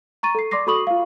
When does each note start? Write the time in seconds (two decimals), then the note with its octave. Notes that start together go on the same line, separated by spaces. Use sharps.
0.23 A#5 C#6 A6 D#7
0.35 A4 C7
0.51 D5 C6 D6 A#6 C7
0.67 F#4 A4 B5 C#6 D#6 F#7
0.87 F4 F5